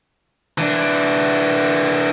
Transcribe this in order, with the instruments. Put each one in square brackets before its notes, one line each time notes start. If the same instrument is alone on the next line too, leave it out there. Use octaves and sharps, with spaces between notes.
[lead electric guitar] E3 D4